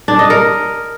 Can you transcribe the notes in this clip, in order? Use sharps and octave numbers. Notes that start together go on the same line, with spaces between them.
D4
D#5
A#4